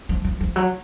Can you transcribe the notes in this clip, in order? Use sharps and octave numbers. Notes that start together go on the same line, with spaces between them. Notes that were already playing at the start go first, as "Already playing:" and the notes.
F3
F3
F3
F#3